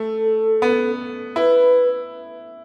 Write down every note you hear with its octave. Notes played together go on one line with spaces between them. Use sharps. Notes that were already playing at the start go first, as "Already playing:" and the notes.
Already playing: A3 A4
B3
E4 B4